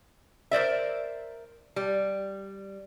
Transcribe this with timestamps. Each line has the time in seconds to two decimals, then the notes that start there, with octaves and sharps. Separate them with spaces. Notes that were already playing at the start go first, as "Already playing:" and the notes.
0.51 A#4 C5 D5 E5
1.76 G3